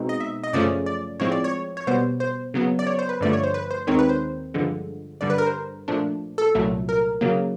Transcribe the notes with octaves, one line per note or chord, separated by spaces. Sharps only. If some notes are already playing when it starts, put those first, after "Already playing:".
Already playing: B2 G#3 C4 D#4
D#5
E5
D#5
F#2 C#3 F3 A3 C#4 D5
D5
A2 F3 G#3 C4 C#5
D5
C#5
C#5
B2 G3 B3 C5
C5
C#3 F#3 B3
D5
C#5
C5
B4
G2 D3 F3 A3 D5
C#5
C5
B4
C5
D#2 D#3 G#3 C4 D#4 C#5
B4
C5
G2 D3 F3 G#3
G2 D3 G3 D5
B4
A#4
C5
A#2 F3 A3 D4
A4
C2 A#2 F#3 A3
A#4
C#3 F#3 A#3